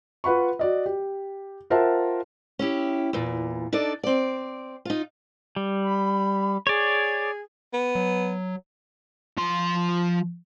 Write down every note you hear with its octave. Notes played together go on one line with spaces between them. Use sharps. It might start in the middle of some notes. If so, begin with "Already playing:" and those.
F4 B4 F#5 B5 C#6
F#4 D5 D#5
G4
F4 A#4 C5 E5 F#5 A5
C#4 E4 G4
E2 A#2
D4 D#4 A4 D5
C4 D5
D#4 F4
G3
B5
G#4 C#5 D5
B3
F#3
F3 C6